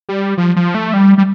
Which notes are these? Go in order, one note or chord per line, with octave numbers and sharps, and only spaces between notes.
G3
F3
F3
A3
G3
G3